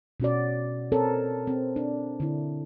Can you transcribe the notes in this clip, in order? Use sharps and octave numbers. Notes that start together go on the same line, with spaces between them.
B2 C#4 F#4 D5
C4 A4 A#4 C#5
C4
D4
D3 E4